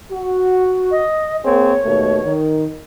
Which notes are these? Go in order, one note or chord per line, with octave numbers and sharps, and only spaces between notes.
F#4
D#5
A#3 C4 G#4 C#5
D#2 B2 A3
D#3